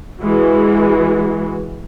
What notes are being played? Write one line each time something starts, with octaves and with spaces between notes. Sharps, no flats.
E3 G#3 F#4